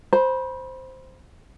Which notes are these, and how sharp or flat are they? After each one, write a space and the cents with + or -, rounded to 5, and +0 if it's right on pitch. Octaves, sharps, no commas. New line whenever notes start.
C5 +0 B5 -30